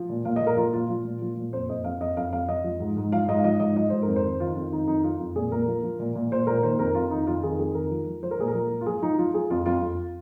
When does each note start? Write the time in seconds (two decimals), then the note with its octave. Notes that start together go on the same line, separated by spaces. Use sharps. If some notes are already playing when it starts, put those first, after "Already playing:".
Already playing: F3
0.09 A#2
0.25 A#2 F5
0.36 D#5
0.41 A#2
0.47 A#4
0.57 F3 F4
0.73 A#2 F4
0.89 F3
1.05 A#2
1.22 F3
1.37 A#2
1.53 F2 C5
1.69 F2 D#5
1.84 F2 F5
2.00 F2 D#5
2.17 F2 F5
2.33 F2 F5
2.49 F2 D#5
2.64 F3
2.80 G#2
2.96 G#2
3.12 F3 F5
3.28 G#2 D#5
3.39 F5
3.44 F3 D#5
3.60 G#2 D#5
3.76 F3 D#5
3.90 G#2 C5
4.02 A#4
4.08 F2
4.16 C5
4.25 D#3
4.40 D#3 F4
4.56 F2 F4
4.72 D#3 D#4
4.87 F2 D#4
5.04 F2 F4
5.20 F2
5.36 A#2 G#4
5.52 A#2 A#4
5.68 F3
5.83 F3
5.99 A#2
6.15 A#2
6.31 A#2 C5
6.47 A#2 A#4
6.63 D#3 C5
6.79 F2 A#4
6.95 F2 F4
7.11 D#3 D#4
7.27 F2 F4
7.43 D#3 G#4
7.59 F2 G#4
7.75 D#3 A#4
7.91 F3
8.07 F3
8.23 F3 C5
8.31 A#4
8.39 A#2 G#4
8.48 A#4
8.54 F3
8.71 F3
8.81 F4
8.86 F3 G#4
9.02 F3 D#4
9.18 F3 F4
9.34 F3 G#4
9.50 F2 F4
9.66 F2 F4
9.82 F2